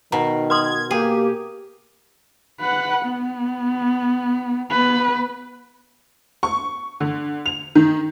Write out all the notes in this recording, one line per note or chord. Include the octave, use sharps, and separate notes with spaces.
B2 D#3 A#5
B4 C6 D#6 G#6
A#3 G4 G#4
B4 F#5
B3
B3 B4
C#6
D3
F7
D#3